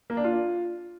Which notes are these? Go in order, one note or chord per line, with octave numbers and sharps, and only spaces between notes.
A#3
D4
F4